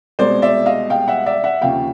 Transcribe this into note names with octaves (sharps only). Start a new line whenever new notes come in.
C2 B2 G#3 C5 D5
D5 E5
D#5 F5
F5 G5
E5 F#5
D5 E5
E5 F#5
D#2 C#3 F3 F5 G5